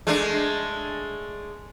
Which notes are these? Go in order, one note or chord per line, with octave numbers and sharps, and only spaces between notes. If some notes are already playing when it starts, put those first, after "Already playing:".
G#3 A3 D4